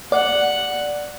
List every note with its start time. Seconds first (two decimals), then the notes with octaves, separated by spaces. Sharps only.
0.12 D5 F#5